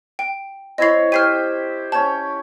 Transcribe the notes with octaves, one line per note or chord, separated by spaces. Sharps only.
G5
C4 E4 C#5 D#5 C7
G4 C5 G5 F6 C7 D#7
C#4 C#5 G5 A5